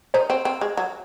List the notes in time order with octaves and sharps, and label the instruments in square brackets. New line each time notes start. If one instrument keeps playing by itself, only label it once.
[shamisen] D#3 D#4 [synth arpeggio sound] C5
[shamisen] C4
C4
G#3
F#3